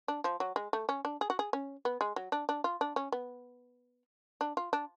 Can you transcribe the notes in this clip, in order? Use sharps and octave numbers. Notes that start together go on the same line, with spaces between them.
D4
F3
F#3
G#3
A3
C#4
D4
G#4
F#4
G#4
C#4
B3
G#3
F#3
D4
D4
F4
D4
C#4
B3
D4
F4
D4